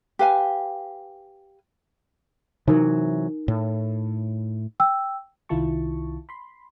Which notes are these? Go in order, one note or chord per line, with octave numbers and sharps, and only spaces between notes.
G4 B4 F5 G#5
C3 E3 F#3 D#4 A#4
A2
G5 E6
C2 D#3 E4 F4 A5 C#6
B5 C6